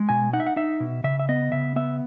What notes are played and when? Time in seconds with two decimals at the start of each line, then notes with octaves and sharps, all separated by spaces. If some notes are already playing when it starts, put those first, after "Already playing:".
Already playing: G#3
0.09 B2 G#5
0.33 D#4 F#5
0.40 E5
0.47 F#5
0.56 D#4 E5
0.80 B2
1.04 C#3 E5
1.19 E5
1.29 B3 D#5
1.52 C#3 E5
1.76 B3 E5